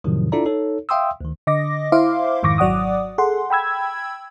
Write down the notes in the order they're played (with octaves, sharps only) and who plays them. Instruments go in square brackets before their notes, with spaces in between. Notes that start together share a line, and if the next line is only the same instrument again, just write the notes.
[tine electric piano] F2 A2 C3 D#3 F3 F#3
D4 E4 F4 A4 D5 A#5
D#4 A4 C#5
E5 F5 G5 C6 D#6 E6
D2 D#3
[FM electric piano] D3 D#5 D6 A#6
E4 C5 E5 F5 C6 D6
F2 G#2 D#3 C#6 D6 A#6
G#1 F#3 D5 F#5 D6 D#6
G#4 A4 F#5 C6
G5 B5 E6 G#6